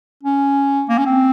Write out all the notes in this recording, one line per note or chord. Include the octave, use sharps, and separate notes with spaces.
C#4
A#3
C#4
C4